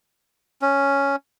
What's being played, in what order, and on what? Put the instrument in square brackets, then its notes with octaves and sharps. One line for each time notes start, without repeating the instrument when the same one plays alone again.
[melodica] C#4